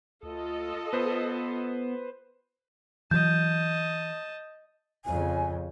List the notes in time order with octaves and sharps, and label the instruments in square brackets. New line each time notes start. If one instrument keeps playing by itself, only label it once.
[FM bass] D2 [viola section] F4 A4 D#5
[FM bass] B3 [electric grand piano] B4 C5
[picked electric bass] E3 F#3 [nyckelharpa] D#5 A5 [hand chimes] G6
[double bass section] F2 C#3 [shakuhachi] G#5